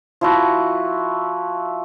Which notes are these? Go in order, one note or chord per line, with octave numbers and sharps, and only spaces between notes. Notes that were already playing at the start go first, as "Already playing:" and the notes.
F3 E4 F#4